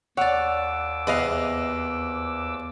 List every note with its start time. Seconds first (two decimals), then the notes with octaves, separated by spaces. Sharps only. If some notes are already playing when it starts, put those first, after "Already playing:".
0.17 D#2 C#5 D5 F#5 D6 E6
1.07 E2 C3 B4 D#5 F5